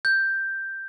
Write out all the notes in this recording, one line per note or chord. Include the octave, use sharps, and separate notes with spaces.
G6